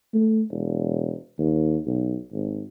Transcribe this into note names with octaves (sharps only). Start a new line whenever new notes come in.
A3
E1
D#2
B1
G#1